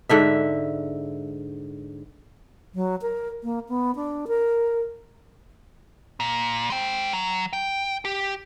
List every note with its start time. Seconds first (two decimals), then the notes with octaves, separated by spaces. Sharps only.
0.09 G#2 D3 E5
2.75 F#3
3.02 A#4
3.43 A#3
3.69 B3
3.95 D4
4.28 A#4
6.20 A#2
6.70 G#3 G5
7.13 F#3
7.53 G5
8.05 G4